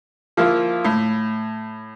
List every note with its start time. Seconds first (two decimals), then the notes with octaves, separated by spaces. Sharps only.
0.37 F3 A#3 E4 F4
0.85 A2